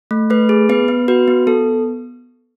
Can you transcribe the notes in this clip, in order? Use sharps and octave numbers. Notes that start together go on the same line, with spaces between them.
A3
A3 B4
G#4
B3 B4
B3
F#4 B4
B3
B3 A4